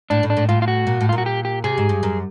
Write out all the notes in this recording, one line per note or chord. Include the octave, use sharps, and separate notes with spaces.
A2 D4
A2
D4
A2
A2 F4
F4
F#4
A#2
A2
F4
A#2
F#4
G4
G4
C3 G#4
G#2
G2
F#2